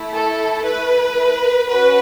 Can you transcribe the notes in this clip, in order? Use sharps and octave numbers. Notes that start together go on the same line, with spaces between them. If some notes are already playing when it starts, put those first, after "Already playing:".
Already playing: A3 E4
A4
B4
C#4 F#4 B4